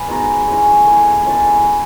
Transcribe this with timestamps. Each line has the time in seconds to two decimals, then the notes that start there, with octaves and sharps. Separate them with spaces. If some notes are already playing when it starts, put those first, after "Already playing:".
Already playing: G#4 B4
0.08 G#3 B3 D#4 F#4
0.48 G#3 C#4 E4
0.86 A3 E4 G#4
1.26 G#3 C#4 E4 A4